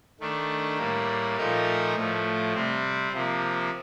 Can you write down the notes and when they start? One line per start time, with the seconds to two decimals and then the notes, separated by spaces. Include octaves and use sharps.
0.20 D#3 A3 D4
0.78 A2 G3 A#3
1.37 A#2 F3 A3 D#4 A#4
1.96 A2 F3 A3
2.54 C3 G3 C4
3.13 C3 F3 A#3